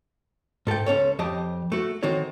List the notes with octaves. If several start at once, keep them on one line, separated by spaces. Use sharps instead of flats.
G#2 A4 B4 G5
C#2 C#4 A4 C#5
F2 G4 D#5 A5
A3 F#4
D#3 C4 F#4 A4 C#5